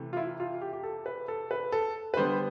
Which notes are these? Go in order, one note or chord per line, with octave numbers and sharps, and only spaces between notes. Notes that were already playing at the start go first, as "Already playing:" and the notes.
Already playing: C3 E3 A3
F4
E4
F4
G4
G4
A4
B4
A4
B4
A4
B4
D3 G3 B3 C5